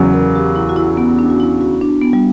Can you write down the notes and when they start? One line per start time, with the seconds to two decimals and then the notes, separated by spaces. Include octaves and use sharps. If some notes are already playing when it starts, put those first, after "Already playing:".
Already playing: E2 C#3 F#3
0.14 A#4
0.36 G4
0.56 E4
0.69 F#4
0.76 E4
0.97 B3
1.19 D4
1.30 F#4
1.40 E4
1.61 F#4
1.73 E4
1.81 D4
2.02 B3
2.13 G3